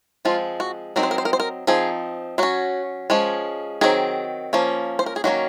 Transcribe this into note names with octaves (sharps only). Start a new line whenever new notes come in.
F3 G#3 C4 F4
F#4
F#3 C4 D#4 A#4
C5
A#4
C5
A#4
C5
A#4
F3 C4 D#4 G#4
F#3 C#4 F#4
F3 G#3 C#4
D#3 F#3 C4 G#4
F3 A#3 C#4
C5
A#4
G#4
D#3 F#3 A#3 C#4 F#4